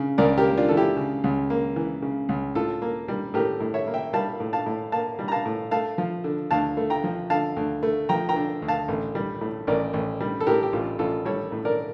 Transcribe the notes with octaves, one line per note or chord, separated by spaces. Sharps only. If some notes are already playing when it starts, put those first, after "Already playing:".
Already playing: C#3
C#2 A#4 D5
G4 A#4
A#3
D4 F4
E3 A4
E4 G4
C#3
C#2
A#3
E3
C#3
C#2
A2 F4 A4
A#3
G3
A2 G4 A#4
A2
C#5 E5
A#3
E5 G5
G3 F5 A5
A2
F5 A5
A2
A#3 F5 A5
G3
A#5
F5 A5
A2
A3 F5 A5
F3
D3
D2 F5 A5
A3
G5 A#5
F3
D3 F5 A5
D2
A3
F3 G5 A#5
G5 A#5
D3
D2
F5 A5
A1
G3
A2
A1 A#4 D5
A1
G3
A4
A2 G4 A#4
G4
A1 F4 A4
A1 F4 A4
G3 A4 C#5
A2
A#4 D5